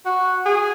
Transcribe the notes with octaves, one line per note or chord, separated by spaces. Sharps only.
F#4
G#4